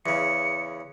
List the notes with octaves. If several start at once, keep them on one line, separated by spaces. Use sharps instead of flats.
E2 C#3 C#7